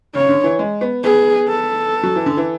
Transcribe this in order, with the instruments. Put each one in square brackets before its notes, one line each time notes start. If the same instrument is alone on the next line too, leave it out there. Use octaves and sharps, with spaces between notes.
[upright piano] C#3 [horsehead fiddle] C#5
[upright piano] D3
E3
G#3
B3
[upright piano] B3 [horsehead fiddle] G#4
[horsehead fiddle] A4
[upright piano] F#3
E3
D3
E3